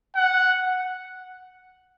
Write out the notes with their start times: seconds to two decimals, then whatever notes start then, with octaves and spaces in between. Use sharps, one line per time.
0.15 F#5